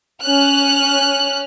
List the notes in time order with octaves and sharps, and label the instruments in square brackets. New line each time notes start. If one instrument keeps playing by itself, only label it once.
[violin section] C#4 F6 F#6